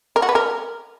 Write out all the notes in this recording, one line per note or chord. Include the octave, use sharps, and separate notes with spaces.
A#4
F#4
B4
A#4